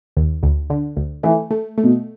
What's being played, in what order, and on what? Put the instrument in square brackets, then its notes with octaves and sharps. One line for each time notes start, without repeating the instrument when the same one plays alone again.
[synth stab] D#2
D2
D3
D2
[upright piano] E3 [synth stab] A3
[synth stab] A3
A3
[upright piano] B2